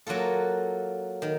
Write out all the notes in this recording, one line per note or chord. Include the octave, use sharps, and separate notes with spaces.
F#3 A#3 F4 A4
D#3